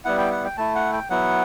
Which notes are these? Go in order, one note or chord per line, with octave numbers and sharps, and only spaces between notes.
G3 B3 E4 F#5
G5
F#5
G5
A3 E4 A5
F#5
G5
F#3 B3 E4 F#5